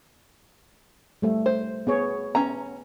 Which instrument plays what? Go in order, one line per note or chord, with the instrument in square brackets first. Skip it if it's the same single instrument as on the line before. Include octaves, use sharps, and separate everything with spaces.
[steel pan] G3 A3 E5
[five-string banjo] C5
[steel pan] B3 G#4 C#5
[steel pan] B3 [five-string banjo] C#4 A#5